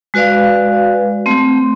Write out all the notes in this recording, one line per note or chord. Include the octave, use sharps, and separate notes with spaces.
G#3 F#4 B4 D5 F5
A3 C4